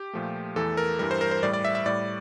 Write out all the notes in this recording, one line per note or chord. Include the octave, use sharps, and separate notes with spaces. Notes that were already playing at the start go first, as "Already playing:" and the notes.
Already playing: G4
A#2 F3 A3
E2 E3 A3 A4
A#4
G2 E3 G3 A#4
C5
A#4
C5
A2 G3 D5
D5
E5
E5
A2 G3 D5